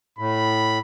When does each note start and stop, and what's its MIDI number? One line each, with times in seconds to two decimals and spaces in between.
0.19 0.79 45
0.19 0.80 83